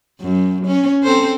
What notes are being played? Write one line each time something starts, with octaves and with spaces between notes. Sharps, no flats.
F#2
C#4
C4 A4 C5